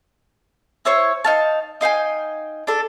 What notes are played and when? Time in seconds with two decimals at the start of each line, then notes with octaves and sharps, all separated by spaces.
0.85 E4 C5 C#5 C#6
1.24 D#4 F5 A5
1.81 D#4 F5 G5 G#5
2.67 D4 A4